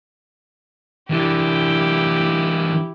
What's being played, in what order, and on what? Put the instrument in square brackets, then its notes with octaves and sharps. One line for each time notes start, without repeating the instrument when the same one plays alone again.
[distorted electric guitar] E3 D4 [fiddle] E4 G4